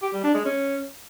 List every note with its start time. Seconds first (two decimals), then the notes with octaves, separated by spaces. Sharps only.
0.02 G4
0.13 G3
0.23 D4
0.34 G#3
0.45 C#4